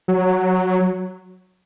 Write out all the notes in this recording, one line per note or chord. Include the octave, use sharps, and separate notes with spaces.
F#3